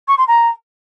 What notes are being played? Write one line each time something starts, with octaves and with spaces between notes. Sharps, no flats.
C#6
C6
A#5